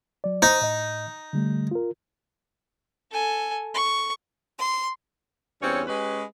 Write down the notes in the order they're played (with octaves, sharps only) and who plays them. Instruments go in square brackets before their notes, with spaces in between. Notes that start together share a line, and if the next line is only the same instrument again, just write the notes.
[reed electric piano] F#3 D5
[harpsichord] D#4 [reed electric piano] C5
[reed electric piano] A2 D#5
D3 G3 A3
F4 A#4
[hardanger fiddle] A4 G#5
C#6
[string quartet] C6
[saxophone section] E2 G2 C4 C#4 C#5
G#3 C#4 G4 B4